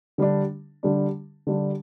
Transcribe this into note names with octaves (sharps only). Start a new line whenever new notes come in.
D3 G3 D4
D3 G3 D4
D3 G3 D4